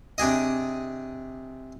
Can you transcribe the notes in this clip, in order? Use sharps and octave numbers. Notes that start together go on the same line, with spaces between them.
C3 D4 G#4 D#5